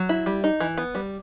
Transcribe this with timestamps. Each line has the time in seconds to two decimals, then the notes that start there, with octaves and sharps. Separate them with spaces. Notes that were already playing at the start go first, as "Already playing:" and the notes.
Already playing: F#3
0.09 E4
0.26 G3
0.44 D#4
0.60 E3
0.78 B3
0.95 G3